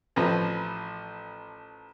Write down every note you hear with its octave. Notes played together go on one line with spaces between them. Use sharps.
A1 F3 B4 A#5